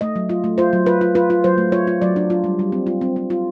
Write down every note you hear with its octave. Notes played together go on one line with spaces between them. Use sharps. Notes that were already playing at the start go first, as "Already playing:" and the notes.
A3 D#5
F#3
F4
A3
F4 C5
F#3
F4 B4
F4
F4 B4
F4
F#3 C5
A3
F4 C#5
F4
F#3 D5
D4
F4
G3
G3
C4
F4
C4
C4
F4